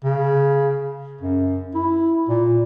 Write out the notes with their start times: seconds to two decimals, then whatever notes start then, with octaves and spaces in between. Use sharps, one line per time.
0.04 C#3
1.21 F#2
1.75 E4
2.29 A#2